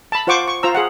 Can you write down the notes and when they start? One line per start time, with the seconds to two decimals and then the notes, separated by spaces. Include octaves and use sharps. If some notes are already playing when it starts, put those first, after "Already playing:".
0.12 A5 B5
0.27 F4 C5 F#5 C#6 D6
0.48 C#6
0.63 F4 C5 A#5 E6
0.75 G#4 F5 F#5